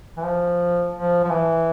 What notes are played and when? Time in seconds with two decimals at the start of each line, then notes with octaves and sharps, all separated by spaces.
0.17 E3
0.25 F3
0.96 F3
1.24 F3
1.31 E3